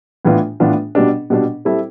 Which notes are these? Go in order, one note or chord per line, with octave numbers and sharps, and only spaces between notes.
A2 E3 B3 D4 F4
A2 E3 B3 D4 F4
B2 G3 D4
B2 G3 D4
G3 C4 E4 A4